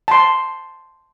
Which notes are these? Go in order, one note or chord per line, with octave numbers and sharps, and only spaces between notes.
A5 C6